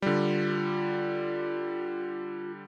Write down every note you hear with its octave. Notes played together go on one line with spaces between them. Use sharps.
D3 G3 F4